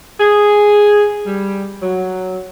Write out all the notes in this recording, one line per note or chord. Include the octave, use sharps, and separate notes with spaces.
G#4
G3
F#3